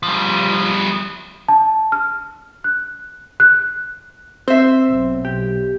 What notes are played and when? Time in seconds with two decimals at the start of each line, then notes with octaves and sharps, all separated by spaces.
0.03 F3 G3
1.48 A5
1.92 F6
2.64 F#6
3.40 F#6
4.48 C4 C5 E5
4.89 B1
5.25 G4